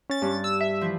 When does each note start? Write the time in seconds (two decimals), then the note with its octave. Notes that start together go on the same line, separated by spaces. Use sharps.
0.10 C#4 A6
0.22 G2 D4
0.44 E6
0.61 E5
0.81 E3 F3